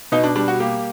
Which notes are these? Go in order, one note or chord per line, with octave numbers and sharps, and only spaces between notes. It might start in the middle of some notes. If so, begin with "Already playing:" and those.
B2 D#4
D4
G3 D4
F#4
A#3 G4